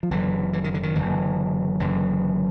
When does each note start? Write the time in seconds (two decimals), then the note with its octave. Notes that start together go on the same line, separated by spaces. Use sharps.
0.03 F3
0.10 F#1 F#2 D3 E3
0.53 E3
0.64 D#3
0.74 D3
0.83 D#3
0.95 F#1 F#2 D3 E3
1.80 F#1 F#2 D3 E3